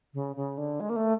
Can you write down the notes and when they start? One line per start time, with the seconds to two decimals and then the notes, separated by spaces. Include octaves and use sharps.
0.14 C#3
0.36 C#3
0.58 D3
0.80 G#3
0.90 A#3
0.96 A3